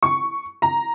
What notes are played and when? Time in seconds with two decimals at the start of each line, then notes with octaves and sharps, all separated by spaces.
0.03 C#6
0.62 A#5